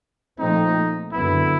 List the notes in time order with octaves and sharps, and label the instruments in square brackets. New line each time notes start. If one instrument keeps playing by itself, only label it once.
[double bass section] A#2 F3 A3 C4 [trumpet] D#4
[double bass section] F#2 D3 F#3 B3 [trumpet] E4